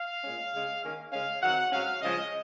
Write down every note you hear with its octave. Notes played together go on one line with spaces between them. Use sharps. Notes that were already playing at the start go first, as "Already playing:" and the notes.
Already playing: F5
A#2 G#3 C#4
C#3 G#3 C#4
D#3 A#3 C#4
C#3 G#3 C#4 F5
D#3 F#3 C4 F#5
G#2 F#3 C#4 F5
C#3 F3 G#3 C#4 D#5